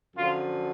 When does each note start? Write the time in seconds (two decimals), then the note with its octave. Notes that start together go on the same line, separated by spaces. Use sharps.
0.17 F#2 D3 F3 F4